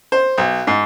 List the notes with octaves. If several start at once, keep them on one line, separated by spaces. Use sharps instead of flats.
C5
B1
G#2